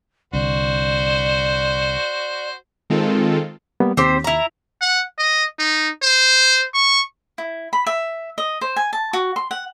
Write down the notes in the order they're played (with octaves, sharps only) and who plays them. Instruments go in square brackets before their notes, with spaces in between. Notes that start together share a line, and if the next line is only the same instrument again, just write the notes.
[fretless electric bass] C2 D3 [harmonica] F#4 C5 [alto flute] D5
[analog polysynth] D#3 G#3 C4 F4 A4
[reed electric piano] G3 A#3 B3
[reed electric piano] D#2 [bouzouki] C4 G4 C5
[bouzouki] E4 A#5
[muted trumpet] F#5
D#5
D#4
C5
C#6
[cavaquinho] E4
B5
E5
D#5
C5
G#5
A5
F#4
C6
F#5